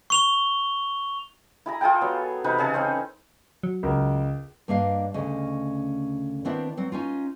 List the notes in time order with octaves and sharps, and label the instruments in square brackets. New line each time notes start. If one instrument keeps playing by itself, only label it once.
[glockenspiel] C#6 F7 G7
[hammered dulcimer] E4 G#4 A#5
F4 G#4 A4 G5
F#3 B3
C3 E3 D#4 B4
C#3 G#4 A4
C4 C#4 C5
[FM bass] F#3
[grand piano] C#2 A#4
[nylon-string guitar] G2 A#3 D4 D#5 F5
D2 C#3 C#4 D#5
D#3 B3 C4 D4 E4 C5
F#3 C4
C#4 D#4 F4